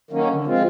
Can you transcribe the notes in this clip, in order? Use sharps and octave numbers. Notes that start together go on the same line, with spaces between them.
D#3 F#3 A#3 C#4
D3
F3 G#3 C4 F4